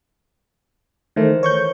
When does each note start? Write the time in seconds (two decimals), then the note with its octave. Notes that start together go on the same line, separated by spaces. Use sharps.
1.16 D#3 E3 A3 A#4 C5
1.43 C#5 C#6 G6